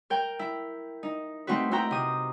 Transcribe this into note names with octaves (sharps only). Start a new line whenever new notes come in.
A#4 G5
E4
D#4
A3 C4 D#4 F#4 B4
C4 E4 F#4 G5 A#5
C3 D#6